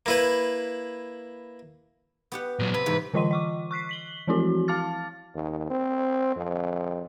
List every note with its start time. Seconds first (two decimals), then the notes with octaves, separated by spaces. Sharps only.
0.06 A#3 E4 B4
2.32 B3 G4 F#5
2.59 A#2 F#3
2.74 C3 B4
2.86 G#2 C3 E3
3.14 D3 E3 F4 D#5 C6 D#7
3.31 D#5 C#6 D6
3.71 C#6 F#6 B6 C7
3.89 B6 F#7 G7
4.27 E3 F3 C4 E4 F#4
4.68 F5 A5 D6 F6 A6
5.35 D#2
5.70 C4
6.36 F2